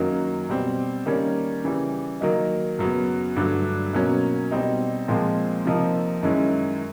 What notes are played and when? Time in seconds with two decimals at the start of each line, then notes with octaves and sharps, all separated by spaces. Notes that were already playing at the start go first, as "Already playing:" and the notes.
Already playing: F#2 D#3 F#3 A#3 C#4
0.49 B2 G3 C4
1.06 D#3 G3 A#3 C#4
1.64 C#3 E3 G3
2.21 D#3 F#3 A#3 D#4
2.79 F#2 C#3 F#3 B3
3.36 G2 D3 F#3 A3
3.93 B2 F#3 A#3 C#4
4.51 B2 G3 C4 D#4
5.08 A#2 F3 G#3 C4
5.66 C3 F3 A#3 D#4
6.23 F#2 D#3 G#3 C#4 E4